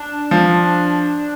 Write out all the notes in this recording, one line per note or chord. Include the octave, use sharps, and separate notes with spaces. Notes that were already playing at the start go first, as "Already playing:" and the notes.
Already playing: D4
F3